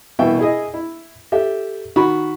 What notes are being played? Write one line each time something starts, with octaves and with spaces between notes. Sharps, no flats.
C2 B2 E3 E5 G5
E4 G#4 D#5
E4
G4 A4 E5
D#3 F#4 B5